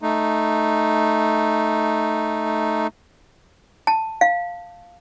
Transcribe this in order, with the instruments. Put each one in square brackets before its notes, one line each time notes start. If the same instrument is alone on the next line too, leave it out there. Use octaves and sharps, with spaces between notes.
[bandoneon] A3 D#4
[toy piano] A5
F5